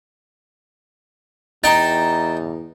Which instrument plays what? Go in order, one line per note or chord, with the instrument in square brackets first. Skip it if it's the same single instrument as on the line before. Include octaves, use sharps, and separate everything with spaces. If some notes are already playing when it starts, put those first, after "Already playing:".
[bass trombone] E2 [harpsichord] D#4 G5 [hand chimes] A#5 A6